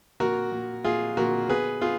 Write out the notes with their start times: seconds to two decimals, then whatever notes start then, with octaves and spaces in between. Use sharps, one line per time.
0.20 A#2 F#4 A#4
0.52 A#2
0.84 A#2 F4 G#4
1.17 A#2 F#4 A#4
1.49 B3 G#4 B4
1.81 B3 F4 G#4